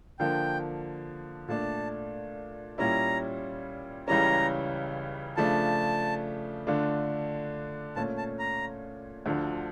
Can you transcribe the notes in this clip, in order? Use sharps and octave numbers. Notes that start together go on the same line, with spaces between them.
D3 F3 A#3 G5
A#2 A3 D4 A5
A#2 G3 C#4 E4 A#5
C#2 C#3 E3 G3 C#4 A#5
C#3 F3 A3 D4 A5
D3 A3 D4 F4
A#2 A3 C#4 A5
A5
A#5
D2 D3 F3